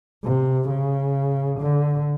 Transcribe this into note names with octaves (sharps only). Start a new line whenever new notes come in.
C3
C#3
D3